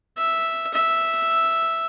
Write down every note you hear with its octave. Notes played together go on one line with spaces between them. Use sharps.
E5
E5